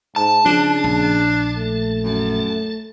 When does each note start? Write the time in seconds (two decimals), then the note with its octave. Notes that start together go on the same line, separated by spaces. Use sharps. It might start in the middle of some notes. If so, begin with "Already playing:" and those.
0.16 G#2 A5
0.46 C#3 F3 D4
0.84 A#1
1.56 A3
2.04 F#2